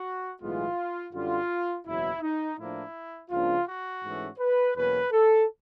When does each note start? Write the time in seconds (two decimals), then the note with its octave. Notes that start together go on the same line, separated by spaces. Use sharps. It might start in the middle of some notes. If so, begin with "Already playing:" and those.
Already playing: F#4
0.41 B1 A2 E3 G#3 B3 F4
1.13 F#2 D3 G3 F4
1.86 F#1 E2 B2 F#3 E4
2.22 D#4
2.58 A2 F3 A#3 D4 E4
3.30 C#2 C#3 F3 A#3 D4 F4
3.66 F#4
4.03 G#2 E3 A3 C#4
4.39 B4
4.75 E2 B2 F#3 A#3 C#4 B4
5.12 A4